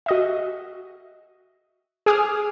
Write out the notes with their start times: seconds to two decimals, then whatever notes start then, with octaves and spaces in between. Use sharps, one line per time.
0.06 F#4 D#5 E5
2.06 G#4 D6 D#6 F6